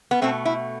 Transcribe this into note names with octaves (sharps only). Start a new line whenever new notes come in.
B3
B2 A3 C4
E4